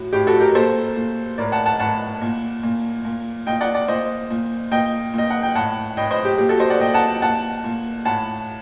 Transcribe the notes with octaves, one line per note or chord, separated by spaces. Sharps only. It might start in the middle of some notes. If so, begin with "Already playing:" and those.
Already playing: A2 F#4
A2 G4
F#4 A4
G4 A#4
A#2 A4 C5
A#2
A2 A#4 D5
F#5 A5
F#5 A5
A2 F#5 A5
A#2
A#2
A#2
A#2 D#5 G5
D5 F#5
D5 F#5
A#2 C5 D#5
A#2
A#2 D#5 G5
A#2 D#5
F#5
G5
A2 F#5 A5
A2 D#5 G5
C5 D#5
G4
A#2 G4
F#4 A4
C5 D#5
D5 F#5
A#2 D#5 G5
F#5 A5
A#2 F#5 A5
A#2
A2 F#5 A5